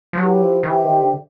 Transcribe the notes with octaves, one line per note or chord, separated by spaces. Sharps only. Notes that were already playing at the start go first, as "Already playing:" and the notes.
F3
F#3 E4 G4 B4
F3
D#3
E3 G4 C5 E5 G5
D#3
D3